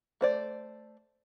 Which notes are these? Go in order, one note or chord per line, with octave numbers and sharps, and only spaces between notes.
A3 C5 D5